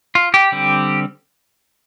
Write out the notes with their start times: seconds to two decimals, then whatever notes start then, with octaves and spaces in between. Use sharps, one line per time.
0.15 F4
0.34 G4
0.52 D3 G3 C4